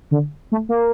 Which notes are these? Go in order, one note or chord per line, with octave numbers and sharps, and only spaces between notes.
D3
A3
A#3